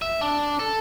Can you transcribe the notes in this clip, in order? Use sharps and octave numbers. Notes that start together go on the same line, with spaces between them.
E5
D4
A4